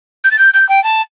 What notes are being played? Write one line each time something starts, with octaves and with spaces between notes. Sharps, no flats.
G6
A6
G6
G6
G5
A5